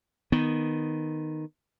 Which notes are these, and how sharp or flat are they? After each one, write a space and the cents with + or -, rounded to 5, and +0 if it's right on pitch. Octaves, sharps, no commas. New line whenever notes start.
D#3 -5 B3 +0